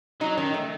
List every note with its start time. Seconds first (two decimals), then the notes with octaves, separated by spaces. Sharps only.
0.20 F#3 D#4
0.37 D#3 C#4
0.54 A3